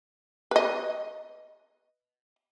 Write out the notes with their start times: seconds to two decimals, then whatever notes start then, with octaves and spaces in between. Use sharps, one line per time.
0.51 B4 D#5